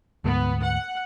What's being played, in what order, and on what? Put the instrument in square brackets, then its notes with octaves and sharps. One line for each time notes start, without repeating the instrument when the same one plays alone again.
[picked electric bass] D2 G#2 [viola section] B3
[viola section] F#5